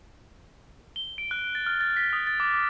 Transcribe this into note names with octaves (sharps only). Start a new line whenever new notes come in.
G7
D7
F#6
A6
F6
A6
B6
D#6
A6
D6
D6